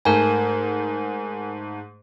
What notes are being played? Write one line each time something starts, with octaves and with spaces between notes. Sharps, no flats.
G#2 A3 A#4 G#5